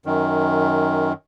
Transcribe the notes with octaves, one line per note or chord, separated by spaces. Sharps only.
F#2 D#3